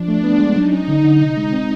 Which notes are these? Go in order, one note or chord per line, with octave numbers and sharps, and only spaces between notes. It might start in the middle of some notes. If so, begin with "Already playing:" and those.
Already playing: F3 D4
A3
B3
G#3
F#3 D#4
C#4
D3
D3
C3
G#3
C4